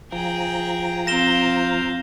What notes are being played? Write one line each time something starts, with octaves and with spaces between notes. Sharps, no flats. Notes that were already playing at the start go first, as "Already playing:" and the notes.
F3 G#4 G5 A#5
C4 F5 G5 A#6 E7 G7